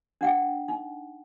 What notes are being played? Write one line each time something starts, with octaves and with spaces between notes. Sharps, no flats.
D4 F#5 G5
D#4